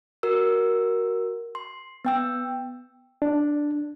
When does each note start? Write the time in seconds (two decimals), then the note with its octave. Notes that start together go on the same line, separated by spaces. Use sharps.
0.23 F#4 A#4 E6
1.55 C6
2.05 B3 G5 E6
3.22 D4